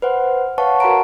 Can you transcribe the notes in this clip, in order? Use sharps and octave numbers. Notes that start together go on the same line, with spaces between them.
B4 C5 F#5
B4 C#5 F5 F#5 A5 C#6
F#4 A#4 F#5 A5 A#5 D7